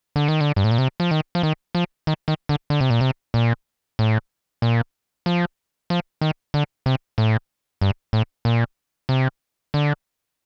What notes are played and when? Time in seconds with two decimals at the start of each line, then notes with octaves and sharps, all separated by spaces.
0.16 D3
0.28 D#3
0.41 D3
0.56 G2
0.64 A2
0.71 A#2
0.78 C3
1.00 F3
1.11 D#3
1.35 F3
1.43 D#3
1.75 F3
2.07 D#3
2.28 D#3
2.49 D3
2.70 D3
2.81 C3
2.90 A#2
3.01 C3
3.34 A#2
3.99 A2
4.62 A#2
5.26 F3
5.90 F3
6.21 D#3
6.54 D3
6.86 C3
7.18 A2
7.81 G2
8.13 A2
8.45 A#2
9.09 C3
9.74 D3